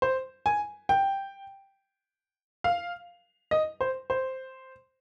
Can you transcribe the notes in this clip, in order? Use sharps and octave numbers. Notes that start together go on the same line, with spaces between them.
C5
G#5
G5
F5
D#5
C5
C5